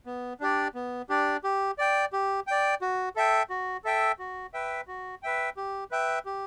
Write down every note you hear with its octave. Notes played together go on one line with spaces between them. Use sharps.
B3
D4 G4 D5
B3
D4 G4 D5
G4
D5 G5
G4
D5 G5
F#4
A4 E5 G5
F#4
A4 E5 G5
F#4
B4 E5 G5
F#4
B4 E5 G5
G4
B4 E5 G5
G4